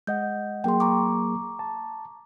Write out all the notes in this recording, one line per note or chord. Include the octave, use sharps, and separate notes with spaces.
G#3 D#5 F#5 G6
F#3 A#3 G#4 G5 C6
A#5 C#6 D6
A5